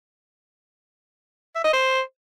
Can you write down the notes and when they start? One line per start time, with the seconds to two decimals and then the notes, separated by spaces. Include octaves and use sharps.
1.55 E5
1.64 D#5
1.73 C5